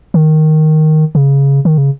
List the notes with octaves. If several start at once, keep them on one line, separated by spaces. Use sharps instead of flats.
D#3
C#3
D#3
C#3